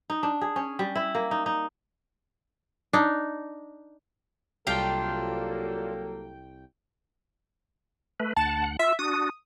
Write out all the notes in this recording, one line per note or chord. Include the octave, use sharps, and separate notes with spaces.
D#4
D4
G#4
C#4
G3
E4
A#3
D#4
D#4
D4 D#4
C2 F#3 A#3 D4 F4 G4 A4 G5
A3 B4
D2 F#5 A5
F4 E5
D4 F#4 D#6